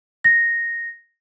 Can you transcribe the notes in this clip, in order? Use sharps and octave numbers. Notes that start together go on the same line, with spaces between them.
A#6